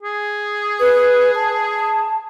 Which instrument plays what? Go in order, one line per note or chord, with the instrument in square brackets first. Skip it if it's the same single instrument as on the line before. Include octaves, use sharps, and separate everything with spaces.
[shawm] G#4
[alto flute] B4
A5